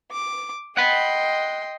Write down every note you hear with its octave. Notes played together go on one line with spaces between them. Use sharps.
D6
D#5 F#5 G5 B5 C6